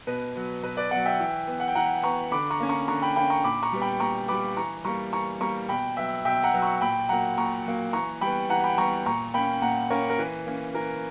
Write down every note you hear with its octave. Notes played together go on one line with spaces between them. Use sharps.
B2 B4
F#3 B3
B2 B4
B4 D5
F#3 B3 D5 F#5
E5 G5
E3
B3
F#5
G5
E3 F#5 A#5
B3 A#5 C#6
D3 B5 D6
A#5 C#6
A#3 C#4
A#5 C#6
D3 A#5 C#6
G5 B5
A#3 C#4 G5 B5
A#5 C#6
A#2 B5 D6
A#5 C#6
G3 B3
G5 B5
A#2 A#5 C#6
G3 B3 B5 D6
E3 A#5 C#6
G3 A#3 A#5 C#6
E3 A#5 C#6
G3 A#3 A#5 C#6
B2 G5 B5
F#3 B3 E5 G5
B2 E5 G5
F#5 A#5
F#3 B3
A#5 C#6
A#2 G5 B5
F#3 A#3 F#5 A#5
A#2 A#5 C#6
F#3 A#3
E3 A#5 C#6
G3 B3 G5 B5
E3 F#5 A#5
G5 B5
G3 B3 A#5 C#6
A#2 A#5 C#6
A#3 C#4 G5 B5
A#2 F#5 A#5
A#3 C#4 A#4 C#5
A#4
E3 B4
A#3 C#4
E3 A#4